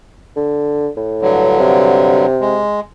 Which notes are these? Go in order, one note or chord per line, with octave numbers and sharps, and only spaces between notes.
D3
A2
G2 D3 F#3
C3
G#3